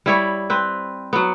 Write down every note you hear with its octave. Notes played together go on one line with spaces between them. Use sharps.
G3 E4 C#5
C4 B4
F#3 B3